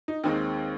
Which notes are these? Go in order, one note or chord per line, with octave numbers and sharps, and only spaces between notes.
D#4
D#2 D#3 G#3 C4 D#4